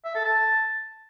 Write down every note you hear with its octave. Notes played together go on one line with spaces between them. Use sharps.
E5
A4
A5